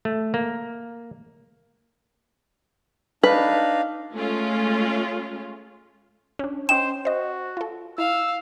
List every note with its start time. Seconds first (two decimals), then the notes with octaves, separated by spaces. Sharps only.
0.05 A3
0.34 A#3
3.23 D4 D#4 B4 F5
4.13 G#3 A3 C#4 F4
6.39 C#4 D4
6.69 C#4 C5 D#5 G5 E7
7.05 F#4 C5 D#5
7.57 F4 A4
7.98 E4 F5 E6